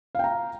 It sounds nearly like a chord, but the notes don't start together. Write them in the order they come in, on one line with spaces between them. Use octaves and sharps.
F5 G5 A#5